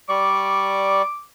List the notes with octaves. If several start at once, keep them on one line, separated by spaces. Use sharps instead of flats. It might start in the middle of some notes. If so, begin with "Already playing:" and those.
G3 D5 C#6 D6